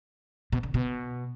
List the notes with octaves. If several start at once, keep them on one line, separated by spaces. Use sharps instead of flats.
B2
D3
B2